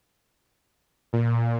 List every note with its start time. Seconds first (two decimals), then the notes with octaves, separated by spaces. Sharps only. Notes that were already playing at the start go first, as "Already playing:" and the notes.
1.13 A#2